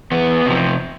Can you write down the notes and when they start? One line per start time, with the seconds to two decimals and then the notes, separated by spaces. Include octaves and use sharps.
0.11 E2 B3
0.46 C3 F3